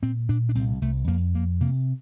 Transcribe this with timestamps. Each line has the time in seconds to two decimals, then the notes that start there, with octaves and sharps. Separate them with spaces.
0.02 A#2 C4
0.29 A#2 D4
0.49 D4
0.55 C2 C4
0.82 C2 A3
1.08 F2 A#3
1.34 F2 A#3
1.61 C3 A#3